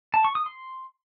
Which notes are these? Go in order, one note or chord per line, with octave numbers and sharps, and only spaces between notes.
A5
C#6
D#6
C6